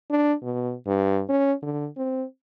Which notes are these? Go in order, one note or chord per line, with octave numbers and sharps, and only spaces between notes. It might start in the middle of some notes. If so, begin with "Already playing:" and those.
D4
B2
G2
C#4
D3
C4